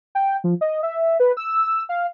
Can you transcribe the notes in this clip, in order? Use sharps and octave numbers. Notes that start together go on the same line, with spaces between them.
G5
F3
D#5
E5
B4
E6
F5